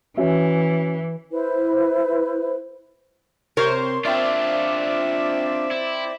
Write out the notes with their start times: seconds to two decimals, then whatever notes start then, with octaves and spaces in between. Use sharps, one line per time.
0.17 E3 C#4 F#4 E5
1.30 E4 B4 C5
3.57 C3 A#4 C5 C#5
4.05 C4 D4 F4 D5 E5
5.71 E4